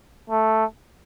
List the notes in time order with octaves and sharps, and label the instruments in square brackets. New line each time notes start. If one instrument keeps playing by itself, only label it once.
[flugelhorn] A3